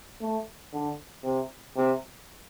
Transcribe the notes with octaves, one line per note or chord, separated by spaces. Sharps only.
A3
D3
C3
C3